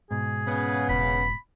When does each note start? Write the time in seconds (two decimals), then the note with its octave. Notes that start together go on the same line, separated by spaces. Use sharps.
0.11 G#2 B2 G#4
0.47 C#3 B3
0.89 E1 B5